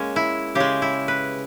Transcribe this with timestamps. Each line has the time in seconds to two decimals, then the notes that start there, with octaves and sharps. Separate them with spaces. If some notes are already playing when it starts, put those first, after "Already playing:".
Already playing: G#3 A#3 C#4
0.16 E4
0.55 C#3 G#3 G4
0.82 E4
1.08 B4